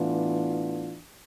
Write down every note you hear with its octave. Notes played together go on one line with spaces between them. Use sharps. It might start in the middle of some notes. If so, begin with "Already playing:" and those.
Already playing: A2 E3 B3 D4 F4